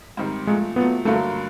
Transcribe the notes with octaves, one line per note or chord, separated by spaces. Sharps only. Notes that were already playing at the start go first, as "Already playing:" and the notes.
G#2 D#3 G3 C4
A#2 F3 G#3 A3
A#2 F#3 A3 B3
G2 D3 F#3 A3 A#3